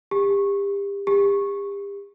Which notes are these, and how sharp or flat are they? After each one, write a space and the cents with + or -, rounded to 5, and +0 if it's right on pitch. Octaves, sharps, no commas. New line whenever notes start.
G4 +30
G4 +35